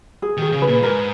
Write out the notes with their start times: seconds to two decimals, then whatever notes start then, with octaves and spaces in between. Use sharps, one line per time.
0.22 G#4
0.37 D#3 G#4
0.52 C#3
0.62 B4
0.67 A#2
0.82 G#2 A#4